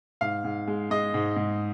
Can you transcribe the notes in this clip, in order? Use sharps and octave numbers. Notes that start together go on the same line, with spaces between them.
G#2 F5
G#2
G#3
G#3 D#5
G#2
G#2